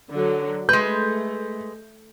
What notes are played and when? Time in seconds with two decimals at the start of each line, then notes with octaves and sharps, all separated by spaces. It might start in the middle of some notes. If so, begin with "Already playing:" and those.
0.11 D3 F#3
0.69 G#3 A3 B4 G6